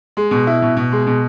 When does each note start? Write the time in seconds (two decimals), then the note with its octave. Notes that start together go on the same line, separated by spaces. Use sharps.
0.17 G#3
0.31 B2
0.47 E4
0.62 B2
0.77 B2
0.92 G#3
1.07 B2